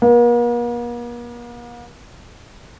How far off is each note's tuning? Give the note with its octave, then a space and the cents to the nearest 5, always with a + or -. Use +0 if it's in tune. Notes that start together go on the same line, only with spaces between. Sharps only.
A#3 +45